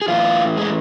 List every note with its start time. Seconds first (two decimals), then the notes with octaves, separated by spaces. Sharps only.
0.02 G#4
0.08 A2 E3 F4
0.57 G#3